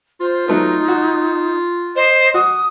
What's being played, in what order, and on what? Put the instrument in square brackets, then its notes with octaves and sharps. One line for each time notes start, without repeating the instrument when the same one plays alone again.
[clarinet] F4 [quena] C5
[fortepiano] F#3 A3 B3 [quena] D#4
[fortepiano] F#4
[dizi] C5 [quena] D#5
[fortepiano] F#4 [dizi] D#6